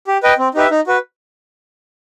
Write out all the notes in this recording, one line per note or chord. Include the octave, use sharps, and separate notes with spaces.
G4
B4 D#5 G5
C4
D#4 G4 B4 E5
D#4
F#4 B4